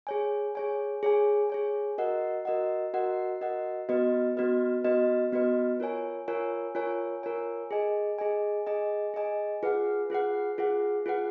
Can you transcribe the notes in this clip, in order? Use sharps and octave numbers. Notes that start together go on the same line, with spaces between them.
G#4 C#5 G#5
G#4 C#5 G#5
G#4 C#5 G#5
G#4 C#5 G#5
F#4 A#4 D#5 F#5
F#4 A#4 D#5 F#5
F#4 A#4 D#5 F#5
F#4 A#4 D#5 F#5
B3 F#4 B4 D#5
B3 F#4 B4 D#5
B3 F#4 B4 D#5
B3 F#4 B4 D#5
F4 A#4 C#5 G#5
F4 A#4 C#5 G#5
F4 A#4 C#5 G#5
F4 A#4 C#5 G#5
G#4 D#5 G#5
G#4 D#5 G#5
G#4 D#5 G#5
G#4 D#5 G#5
F4 G#4 B4 F#5
F4 G#4 B4 F#5
F4 G#4 B4 F#5
F4 G#4 B4 F#5